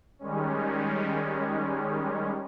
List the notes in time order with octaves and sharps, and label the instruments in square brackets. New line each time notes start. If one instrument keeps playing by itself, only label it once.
[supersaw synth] D#3 G3 G#3 C#4